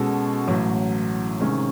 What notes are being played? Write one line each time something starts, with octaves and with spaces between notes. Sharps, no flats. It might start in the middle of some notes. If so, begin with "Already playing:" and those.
Already playing: B2 G#3 C#4 F#4 A4
A1 A2 F#3
C3 D#3 G#3 C#4